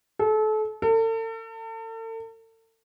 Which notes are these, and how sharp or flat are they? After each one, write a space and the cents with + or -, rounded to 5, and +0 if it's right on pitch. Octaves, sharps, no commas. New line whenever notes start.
A4 -30
A4 +40